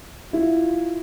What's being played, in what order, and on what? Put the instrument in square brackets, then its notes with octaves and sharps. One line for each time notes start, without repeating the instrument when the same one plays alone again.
[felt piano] E4 [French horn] F4